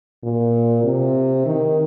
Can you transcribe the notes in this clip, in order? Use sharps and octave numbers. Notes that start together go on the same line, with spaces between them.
A#2
C3
D#3